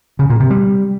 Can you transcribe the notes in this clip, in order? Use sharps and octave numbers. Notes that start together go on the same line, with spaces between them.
C#3
A#2
C3
G3